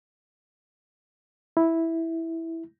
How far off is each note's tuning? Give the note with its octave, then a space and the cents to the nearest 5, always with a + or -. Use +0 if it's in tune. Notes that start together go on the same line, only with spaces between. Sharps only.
E4 -5